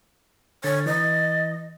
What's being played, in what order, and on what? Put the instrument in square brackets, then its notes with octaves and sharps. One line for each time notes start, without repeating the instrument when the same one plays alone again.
[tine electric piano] D3 [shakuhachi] C#5 [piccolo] A6
[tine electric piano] E3 [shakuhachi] D#5 [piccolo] A6